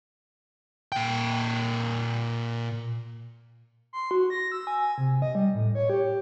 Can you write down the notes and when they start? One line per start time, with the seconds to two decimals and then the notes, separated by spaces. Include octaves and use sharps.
0.92 A#2 G5
3.93 C6
4.11 F#4
4.30 A#6
4.52 E6
4.67 G#5
4.98 C3
5.22 D#5
5.35 G3
5.55 A2
5.75 C#5
5.90 G4